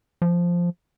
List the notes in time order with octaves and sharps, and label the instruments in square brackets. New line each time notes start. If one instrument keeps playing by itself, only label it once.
[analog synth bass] F3